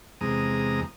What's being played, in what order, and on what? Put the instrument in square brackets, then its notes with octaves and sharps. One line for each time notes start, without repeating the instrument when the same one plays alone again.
[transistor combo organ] E2 C3 G#3 A#5 D#6